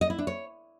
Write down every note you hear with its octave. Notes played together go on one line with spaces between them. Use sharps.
D#5
E4
D4
C#5